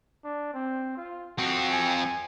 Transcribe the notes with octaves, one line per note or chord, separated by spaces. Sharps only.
D4
C4
F4
F2 C4 F#4
G#5